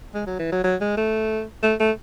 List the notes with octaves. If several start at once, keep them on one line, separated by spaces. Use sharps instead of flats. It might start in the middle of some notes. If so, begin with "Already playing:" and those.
G#3
F#3
E3
F#3
F#3
G#3
A3
A3
A3